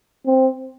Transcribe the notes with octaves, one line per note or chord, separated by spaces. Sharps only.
C4